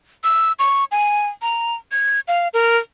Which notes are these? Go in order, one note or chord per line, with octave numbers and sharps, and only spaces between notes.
E6
C#6
G#5
A#5
G#6
F5
A#4